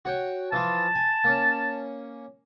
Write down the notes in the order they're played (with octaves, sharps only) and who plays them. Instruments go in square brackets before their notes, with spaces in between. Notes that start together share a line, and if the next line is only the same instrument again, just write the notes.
[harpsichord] F#4 C#5 G5
[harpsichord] E3 F3 F4 [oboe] A5
[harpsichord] G#5
A#3 C#4